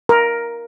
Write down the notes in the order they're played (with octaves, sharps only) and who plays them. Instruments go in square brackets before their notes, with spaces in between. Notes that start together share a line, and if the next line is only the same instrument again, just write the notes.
[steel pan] A#4